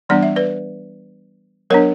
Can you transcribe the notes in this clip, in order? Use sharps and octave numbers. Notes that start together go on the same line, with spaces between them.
E3 G3 B3 D4 D5
E5
B4 D5
F#3 B3 D4 A#4 C#5